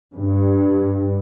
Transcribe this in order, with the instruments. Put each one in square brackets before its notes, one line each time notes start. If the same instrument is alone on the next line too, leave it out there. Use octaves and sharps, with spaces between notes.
[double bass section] G2